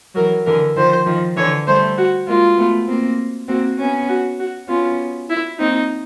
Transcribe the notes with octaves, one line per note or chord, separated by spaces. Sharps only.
E3 F#3 A#4
D3 E3 A#4
D#3 F3 C5
D#3 F3
D3 E3 C#5
G3 A3 C5
F#4
G#3 A#3 F4
A3 B3
A#3 C4
A#3 C4 F#4
B3 C#4
F#4
F#4
B3 C#4 F4
E4
A#3 C4 D#4